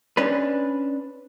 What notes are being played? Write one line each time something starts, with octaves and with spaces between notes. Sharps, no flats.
C#4 D4 B4